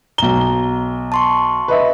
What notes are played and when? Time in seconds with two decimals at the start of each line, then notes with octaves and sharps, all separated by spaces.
0.18 B1 A#5 G7
1.12 A5 C6 C#6
1.68 B4 D#5 E5